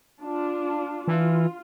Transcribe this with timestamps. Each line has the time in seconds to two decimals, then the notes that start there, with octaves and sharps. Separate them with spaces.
0.22 D4 F4
1.08 E3 F4